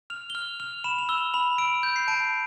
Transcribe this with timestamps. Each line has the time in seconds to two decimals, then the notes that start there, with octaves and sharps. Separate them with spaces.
0.10 F6 F7
0.30 G7
0.35 F6 F7
0.60 F6 F7
0.84 B5 E7
0.99 F7
1.09 E6 G7
1.34 B5 F7
1.58 E6 D7
1.83 G6
1.96 C7
2.08 A5 D7